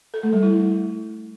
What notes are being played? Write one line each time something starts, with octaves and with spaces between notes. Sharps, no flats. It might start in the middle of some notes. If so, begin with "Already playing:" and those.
A4
A3
G3
E4